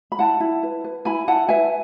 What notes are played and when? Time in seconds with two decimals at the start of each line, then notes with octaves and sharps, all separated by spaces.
0.12 B5
0.19 E4 F#5 A5
0.40 E4
0.63 B4
0.84 B4
1.05 E4 G#5 B5
1.28 E4 F#5 A5
1.49 B4 E5 G#5